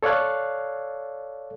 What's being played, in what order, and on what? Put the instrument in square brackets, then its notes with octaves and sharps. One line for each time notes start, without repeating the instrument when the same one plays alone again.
[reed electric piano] A4 C#5 D5 F5 F#6